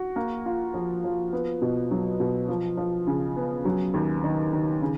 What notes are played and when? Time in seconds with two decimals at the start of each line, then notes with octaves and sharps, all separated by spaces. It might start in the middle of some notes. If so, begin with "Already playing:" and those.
Already playing: F#4
0.16 A#3
0.46 F4
0.74 F3
1.04 F3
1.33 B3
1.62 B2
1.91 F#3
2.20 B2
2.48 F3
2.77 F3
3.07 C#3
3.37 B3
3.65 F#3
3.94 D#2
4.24 D#3
4.53 D#3
4.82 C#3